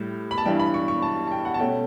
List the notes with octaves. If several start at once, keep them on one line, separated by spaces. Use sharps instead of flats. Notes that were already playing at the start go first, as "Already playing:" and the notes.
Already playing: A2 G3
B5
A5
G2 E3 G3 G5
B5
C#6
C#6
A5
A5
G5
F#5
A5
B2 A3 C#4 G5